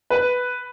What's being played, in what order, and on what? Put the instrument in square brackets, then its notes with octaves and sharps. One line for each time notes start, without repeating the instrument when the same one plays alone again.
[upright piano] B4